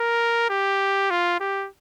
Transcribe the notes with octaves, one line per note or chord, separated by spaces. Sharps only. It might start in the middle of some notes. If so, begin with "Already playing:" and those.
Already playing: A#4
G4
F4
G4